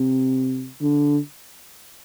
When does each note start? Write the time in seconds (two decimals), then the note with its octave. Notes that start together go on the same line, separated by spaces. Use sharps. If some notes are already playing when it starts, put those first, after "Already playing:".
Already playing: C3
0.81 D3